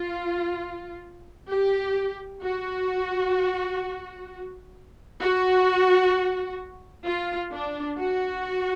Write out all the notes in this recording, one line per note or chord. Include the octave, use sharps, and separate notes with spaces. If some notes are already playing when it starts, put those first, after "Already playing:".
Already playing: F4
G4
F#4
F#4
F4
D4
F#4